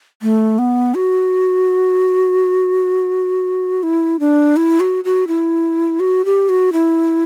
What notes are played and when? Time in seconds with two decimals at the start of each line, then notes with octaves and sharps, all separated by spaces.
0.22 A3
0.59 B3
0.95 F#4
3.83 E4
4.20 D4
4.57 E4
4.80 F#4
5.04 F#4
5.28 E4
6.00 F#4
6.25 G4
6.49 F#4
6.73 E4